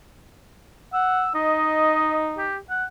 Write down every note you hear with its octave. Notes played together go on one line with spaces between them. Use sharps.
F#5 E6
D#4 D#5
G4
F#5